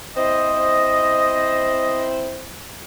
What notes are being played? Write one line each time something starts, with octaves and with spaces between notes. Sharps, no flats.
C4 E4 C5 D#5